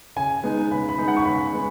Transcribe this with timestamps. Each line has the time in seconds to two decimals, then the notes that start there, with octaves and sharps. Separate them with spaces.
0.16 C#3 G#5
0.43 G#3 B3 D#4
0.71 C#3 B5
0.89 B5
0.98 G#3 B3 D#4
1.08 F#5
1.17 C#6
1.25 C#3 B5
1.53 G#3 B3